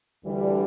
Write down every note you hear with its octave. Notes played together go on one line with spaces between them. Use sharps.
D2 D3 E3 G3